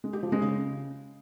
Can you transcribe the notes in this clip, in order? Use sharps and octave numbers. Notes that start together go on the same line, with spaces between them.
G#3
G4
F3
G#3
C#3